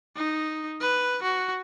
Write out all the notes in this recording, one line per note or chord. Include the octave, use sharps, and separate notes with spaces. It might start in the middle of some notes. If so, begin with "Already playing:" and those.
D#4
B4
F#4